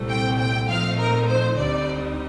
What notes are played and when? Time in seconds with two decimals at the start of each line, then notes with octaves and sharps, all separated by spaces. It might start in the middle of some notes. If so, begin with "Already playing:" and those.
Already playing: C2 A#2 A3 C4
0.09 G5
0.39 G5
0.68 A#2 F3 A3 C4 D#4 F5
0.98 A#4
1.28 C5
1.56 D2 D3 G3 C4 D#4 D5